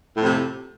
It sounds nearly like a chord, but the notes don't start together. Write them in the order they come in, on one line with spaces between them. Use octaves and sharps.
A2 F2 C3